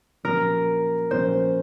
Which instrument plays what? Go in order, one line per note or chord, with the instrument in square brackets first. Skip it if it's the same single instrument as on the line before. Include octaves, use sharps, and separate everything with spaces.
[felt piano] A#1 A#2 F#3 C#4 [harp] A#4
[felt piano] A#1 A#2 F#3 C#4 [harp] C5